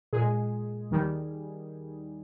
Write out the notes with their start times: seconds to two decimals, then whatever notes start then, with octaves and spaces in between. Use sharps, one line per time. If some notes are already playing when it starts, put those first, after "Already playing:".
0.13 A#2 G#3 G#4
0.91 D#2 D#3 G3